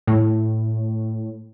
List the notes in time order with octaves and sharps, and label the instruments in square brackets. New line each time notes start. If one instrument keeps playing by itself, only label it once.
[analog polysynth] A2